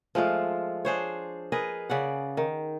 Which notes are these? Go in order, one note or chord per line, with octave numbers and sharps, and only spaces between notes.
F3 G#3 A3 F4
D4 G#4 C5 C#5
G#4 A#4 B4 D#5
C#3 D5 F#5
D#3